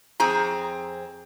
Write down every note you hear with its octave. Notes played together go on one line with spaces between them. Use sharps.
F2 C4 G#4 A#5